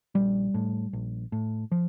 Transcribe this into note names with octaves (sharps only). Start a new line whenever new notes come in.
A#1 G3
A2
A#1
A2
F3